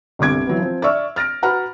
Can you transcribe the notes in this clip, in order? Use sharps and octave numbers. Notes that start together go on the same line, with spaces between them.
G1 C2 D3 D6 G#6 D7
E3 F#3 B3
F3 C4
D5 E5 C#6 E6 F6
F6 A6 A#6 D7
F#4 B4 F#5 A#5 B5 F6